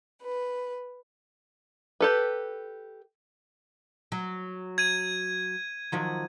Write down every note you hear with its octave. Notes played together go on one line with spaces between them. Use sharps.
B4
G4 A4 B4
F#3
G#6 D#7
D#3 F3 F#3